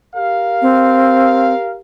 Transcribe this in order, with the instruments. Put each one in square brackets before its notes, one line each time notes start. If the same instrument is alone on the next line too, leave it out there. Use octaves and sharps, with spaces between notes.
[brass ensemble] G4 A#4 F5
[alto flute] C4